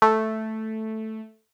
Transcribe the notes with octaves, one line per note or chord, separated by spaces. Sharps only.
A3